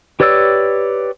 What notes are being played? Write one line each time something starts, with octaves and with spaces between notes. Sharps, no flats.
G4 B4 C#5 D5 E6